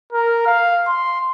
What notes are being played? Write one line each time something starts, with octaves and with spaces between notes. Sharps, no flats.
A#4
F5
C6